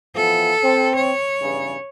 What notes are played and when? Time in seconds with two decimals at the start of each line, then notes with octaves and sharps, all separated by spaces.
0.16 E3 F3 B3 A4
0.64 C4
0.96 C#5
1.42 E2 G2 C#3